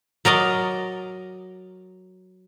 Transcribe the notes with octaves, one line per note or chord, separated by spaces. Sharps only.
F#3 A#4 D5 D#5